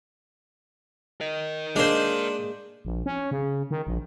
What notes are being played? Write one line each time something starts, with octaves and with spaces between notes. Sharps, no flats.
A#4 D#5
G#3 A#3 D4 C5
A#1
C#4
C#3
D#3
A#1